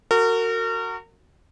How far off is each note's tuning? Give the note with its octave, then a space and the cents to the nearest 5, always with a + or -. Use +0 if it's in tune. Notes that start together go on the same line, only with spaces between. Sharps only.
F#4 +0 A#4 -35